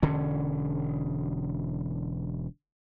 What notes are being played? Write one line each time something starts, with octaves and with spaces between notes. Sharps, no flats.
E1 D3 C#4